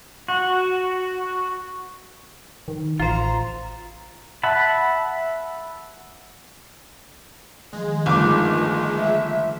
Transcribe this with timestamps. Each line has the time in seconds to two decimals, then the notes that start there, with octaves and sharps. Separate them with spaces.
0.28 F#4
2.68 D#3
3.00 A1 F4 C5 A#5
4.43 E5 F#5 A5 B5
7.73 D#3 F3 G#3
8.06 G1 D#3 A3 F4 D6
8.99 E5